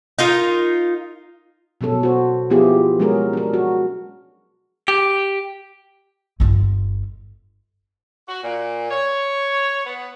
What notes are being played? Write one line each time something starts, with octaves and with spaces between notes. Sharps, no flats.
D#4 F4 A#4
B2 F#3 C#4 A4
F#4 C5
F3 B3 E4 F4 G4 G#4
F#3 G#3 C#4 F#4 G#4 A#4
D4 A#4
F#4
G4
G1 F4
F#4
A#2
C#5
B3